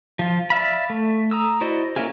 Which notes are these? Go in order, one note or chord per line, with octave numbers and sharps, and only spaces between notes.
F3 F4
D5 E5 F5 B5
A3
A#5 D#6 E6
E4 F#4 C5 D5 D#5
A#3 C#4 E4 F4 G#4